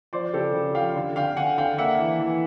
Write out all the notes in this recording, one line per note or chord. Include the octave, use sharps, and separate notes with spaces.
F3 C5 D5
C#3 G4 A4
C#3
F3 F5 G5
D3
D3 F5 G5
D3 F#5 G#5
D3 F5 G5
A#3 E5 F#5
E3
E3